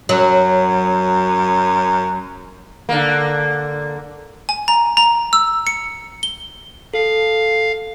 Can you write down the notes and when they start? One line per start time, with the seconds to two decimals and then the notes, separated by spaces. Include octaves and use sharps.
0.09 F#2 F#3
2.89 D3 A#3
4.49 G#5
4.68 A#5
4.97 A#5
5.33 E6
5.67 C#7
6.23 G7
6.94 A4 F5